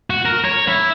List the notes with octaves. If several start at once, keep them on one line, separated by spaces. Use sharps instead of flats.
F#4
A#4
C#5
E4